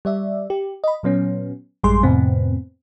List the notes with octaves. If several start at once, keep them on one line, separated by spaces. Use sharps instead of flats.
G3 D5 E5
G4
D#5 B5
A#2 F#3 B3 C#4
A1 F#2 G3 G#3 G#4 C6
F2 A2 C3 B3 C4